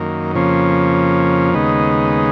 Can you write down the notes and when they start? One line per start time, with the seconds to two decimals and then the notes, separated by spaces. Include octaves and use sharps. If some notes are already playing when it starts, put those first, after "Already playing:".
Already playing: F#2 D#3 A#3
0.35 F2 C#3 F3 A#3 C#4
1.54 D#2 C#3 G#3 B3 D#4